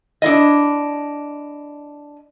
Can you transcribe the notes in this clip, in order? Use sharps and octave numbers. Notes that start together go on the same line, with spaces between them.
D4 E4 D#5